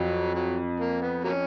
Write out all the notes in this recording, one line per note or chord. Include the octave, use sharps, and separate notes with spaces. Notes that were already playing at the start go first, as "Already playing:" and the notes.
Already playing: F2 F#3
F#3
A#3
B3
F#3 A#3 C#4